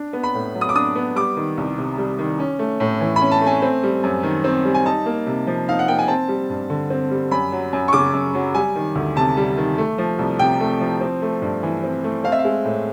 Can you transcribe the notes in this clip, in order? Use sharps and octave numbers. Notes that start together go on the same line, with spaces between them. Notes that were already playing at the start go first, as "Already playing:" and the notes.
Already playing: D4
B3
B5
A2
F#3
D#6
D6
D4 D#6
B3
G3 D6
D#3
C2
C3
G3
D#3
C#4
A3
A2
E3
B5
C#4
A5
A3
G#5
C4
G3
F#2
D#3
C4
G3
G#5
D#4 A5
A#3
C3
F3
D#4 F5
F#5
A#3 G5
G#5
C4 A5
G3
G2
D3
C4
G3
F#2 B5
F#3
F#2
C#6
C#3 D6
F#2
F#3
G3 G#5
D#3
D2
C3 A5
G3
D#3
A3
F3
C2
C3 G5
A3
F3
C4
A3
G2
E3
C4
A3
C4 F5
E5
F5
G#3
A2